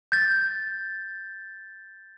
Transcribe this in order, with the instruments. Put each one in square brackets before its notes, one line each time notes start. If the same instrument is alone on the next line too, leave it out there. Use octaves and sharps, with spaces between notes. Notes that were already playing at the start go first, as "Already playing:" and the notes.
[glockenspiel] G6 A6